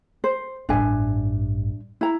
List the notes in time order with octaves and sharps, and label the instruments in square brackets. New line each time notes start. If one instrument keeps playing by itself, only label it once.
[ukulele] C5
[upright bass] A1 G2 [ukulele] D4 E5 G#5
[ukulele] E4 A#5